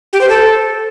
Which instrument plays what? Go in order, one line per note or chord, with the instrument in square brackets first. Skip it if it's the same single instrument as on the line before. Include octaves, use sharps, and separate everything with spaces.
[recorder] G4
C5
A4